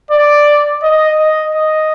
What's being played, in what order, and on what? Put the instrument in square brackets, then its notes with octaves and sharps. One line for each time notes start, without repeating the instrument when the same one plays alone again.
[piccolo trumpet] D5
D#5
D#5
D#5